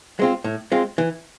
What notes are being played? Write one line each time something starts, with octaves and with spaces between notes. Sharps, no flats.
G#3 C4 F4
A2
G#3 C4 F4
E3